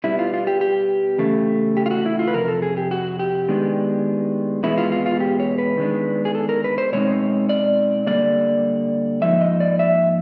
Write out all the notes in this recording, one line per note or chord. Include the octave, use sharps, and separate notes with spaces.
B2 G3 B3 E4
F4
F4
G4
G4
E2 C#3 A3
G4
F4
F#4
E4
F4
B4
F2 C3 A#4
A4
G#4
G4
F#4
G4
D#3 G#3 B3 D4
E2 B2 G#3 B3 E4
F4
F4
F4
G4
C#5
B4
D#3 G#3 B3 D4
G#4
A4
A#4
B4
C5
B2 G#3 C4 D#4 C#5
D5
D3 G3 A#3 D5
G#2 F3 A#3 D#4 E5
D#5
D5
E5